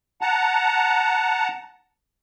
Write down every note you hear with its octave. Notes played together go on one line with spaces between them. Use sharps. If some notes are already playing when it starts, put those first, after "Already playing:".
F#5 A5 A#5